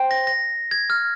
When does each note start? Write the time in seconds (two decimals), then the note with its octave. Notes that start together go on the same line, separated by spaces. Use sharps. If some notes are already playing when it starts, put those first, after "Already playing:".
Already playing: C5 G5
0.11 A#6
0.27 A#6
0.71 G#6
0.90 F6